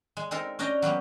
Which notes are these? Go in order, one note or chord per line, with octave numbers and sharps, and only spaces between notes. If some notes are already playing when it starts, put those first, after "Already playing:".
G#3
G#3 C4 D#4 A4 A#4
C#4 D4 D#5 G5 A#5
F#3 A#3 B3 G4